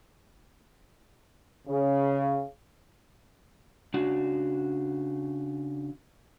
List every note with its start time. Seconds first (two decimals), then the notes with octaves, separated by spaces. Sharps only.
1.68 C#3
3.94 C#3 D4 F#4 F#5